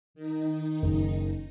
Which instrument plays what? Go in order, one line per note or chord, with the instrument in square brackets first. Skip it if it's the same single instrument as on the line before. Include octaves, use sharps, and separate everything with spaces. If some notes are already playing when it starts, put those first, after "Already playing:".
[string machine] D#3 D#4
[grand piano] F#1